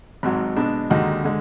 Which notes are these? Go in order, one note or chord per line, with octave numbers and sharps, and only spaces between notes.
G#1 G#2 F#3
B2 G#3 D4
D#2 D3 G#3 D#4 F#4
D3 G#3